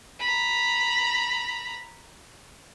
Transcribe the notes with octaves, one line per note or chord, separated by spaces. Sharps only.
A#5 B5